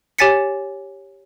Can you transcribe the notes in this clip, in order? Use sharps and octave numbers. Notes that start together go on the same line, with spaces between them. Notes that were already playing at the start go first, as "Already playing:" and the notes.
G4 C#5 G#5 A6 B6 C#7